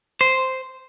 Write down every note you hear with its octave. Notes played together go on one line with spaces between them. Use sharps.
C5